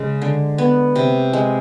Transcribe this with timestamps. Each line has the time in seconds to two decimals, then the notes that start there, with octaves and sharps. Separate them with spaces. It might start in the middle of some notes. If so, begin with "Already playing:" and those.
Already playing: C#3 G#3
0.22 D3
0.58 B3
0.96 C3
1.33 G#3